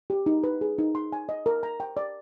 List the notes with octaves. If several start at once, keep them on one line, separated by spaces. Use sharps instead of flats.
G4
D#4
B4
G#4
D#4
C6
G#5
D#5
A#4
A#5
G5
D5